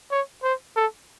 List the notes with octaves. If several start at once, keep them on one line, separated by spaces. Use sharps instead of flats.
C#5
C5
A4